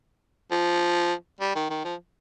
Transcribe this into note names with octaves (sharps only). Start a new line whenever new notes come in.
F3
G3
D#3
D#3
F3